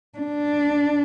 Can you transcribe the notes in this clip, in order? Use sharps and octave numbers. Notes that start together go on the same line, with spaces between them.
D4